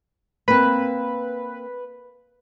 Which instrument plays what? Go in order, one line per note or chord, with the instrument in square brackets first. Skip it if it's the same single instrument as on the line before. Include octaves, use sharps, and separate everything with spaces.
[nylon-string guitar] A#3 C4 [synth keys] B4